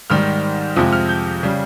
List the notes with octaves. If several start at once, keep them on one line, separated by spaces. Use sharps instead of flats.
G#2 D#3 G3 F6
F2 C3 F3 G#3 D#6
F6
G6
C#3 G3